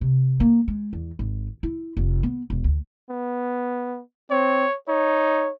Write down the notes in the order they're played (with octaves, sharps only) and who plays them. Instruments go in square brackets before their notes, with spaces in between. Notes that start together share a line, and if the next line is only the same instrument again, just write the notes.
[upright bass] C3
A#3
G#3
E2
G#1
E4
F1
B3
E1
D2
[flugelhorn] B3
[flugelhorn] C4 [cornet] C#5
[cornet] D#4 [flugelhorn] C#5